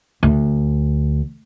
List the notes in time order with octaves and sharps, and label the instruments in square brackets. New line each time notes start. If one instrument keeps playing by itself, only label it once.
[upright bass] D2